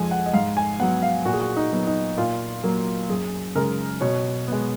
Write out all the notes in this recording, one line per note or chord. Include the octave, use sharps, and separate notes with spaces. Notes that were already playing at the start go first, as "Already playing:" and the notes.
Already playing: F2 F3 G#3 G#5
F#5
D#5
G#2 F5
G#5
F#3 B3 F#5
F5
A#2 F#4
G#4
F#4
D#4
F#3 B3
D#4
A#2 F4
F#3 A#3
F#2 G#4
C#3 G#3 A#4
B2 C#5
G#3 B3